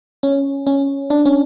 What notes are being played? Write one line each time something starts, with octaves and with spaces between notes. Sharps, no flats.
C#4
C#4
D4
C#4